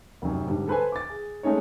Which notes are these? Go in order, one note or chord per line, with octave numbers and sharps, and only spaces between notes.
F1 F#2
G#2 D3 G3
A4 B4 C5 G#5
D6 A6
G#4
G#3 A3 C#4 D#4 C#5